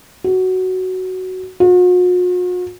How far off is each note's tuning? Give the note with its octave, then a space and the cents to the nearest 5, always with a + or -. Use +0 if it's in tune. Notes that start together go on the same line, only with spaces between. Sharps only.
F#4 +10
F#4 -45